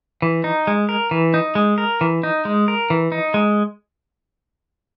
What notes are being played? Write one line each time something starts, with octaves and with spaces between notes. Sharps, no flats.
E3
D#4
G#3
A#4
E3
D#4
G#3
A#4
E3
D#4
G#3
A#4
E3
D#4
G#3